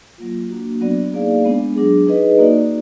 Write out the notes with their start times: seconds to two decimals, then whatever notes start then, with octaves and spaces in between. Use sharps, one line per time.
0.18 F#3 A#3 F4
0.50 A#3 D4 F#4
0.81 F#3 B3 D4 F#4 D5
1.13 A#3 D#4 G#4 D5 F5
1.44 G#3 B3 D4
1.76 F#3 D4 G#4
2.07 D#4 G#4 B4 D#5
2.39 A#3 D#4 F#4 D5